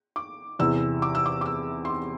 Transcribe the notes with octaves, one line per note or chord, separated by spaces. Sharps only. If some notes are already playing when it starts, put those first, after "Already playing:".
D6
E2 C3 E3 E6
D6
E6
D6
D6
E6
C6
D6